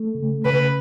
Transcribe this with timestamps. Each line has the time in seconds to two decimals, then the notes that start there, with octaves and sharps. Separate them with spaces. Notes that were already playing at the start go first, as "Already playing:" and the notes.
Already playing: A3
0.15 C#3
0.45 C#3 B4